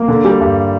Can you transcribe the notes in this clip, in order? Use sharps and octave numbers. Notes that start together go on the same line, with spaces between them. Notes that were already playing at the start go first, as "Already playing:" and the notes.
Already playing: A#3
D3
G3
G2